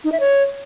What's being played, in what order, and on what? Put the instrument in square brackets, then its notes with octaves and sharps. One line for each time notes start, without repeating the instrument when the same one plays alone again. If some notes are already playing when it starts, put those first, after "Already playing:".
[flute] D#4
E5
C#5